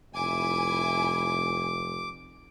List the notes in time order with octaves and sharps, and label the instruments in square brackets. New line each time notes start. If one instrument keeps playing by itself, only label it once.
[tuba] F1 [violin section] E4 G#5 [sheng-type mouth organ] D6